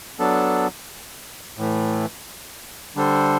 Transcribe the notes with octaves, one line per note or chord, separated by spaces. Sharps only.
F#3 B3 D4 A4
A2 E3 A3
D3 G3 D4 A4 C5